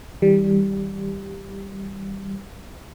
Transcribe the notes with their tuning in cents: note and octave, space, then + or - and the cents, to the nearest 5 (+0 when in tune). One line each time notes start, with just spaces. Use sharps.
E3 -45 G3 +0